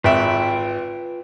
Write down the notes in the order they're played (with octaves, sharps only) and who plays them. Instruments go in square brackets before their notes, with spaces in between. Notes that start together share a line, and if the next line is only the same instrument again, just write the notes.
[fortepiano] G#1 E5 [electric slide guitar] F4 B4 G5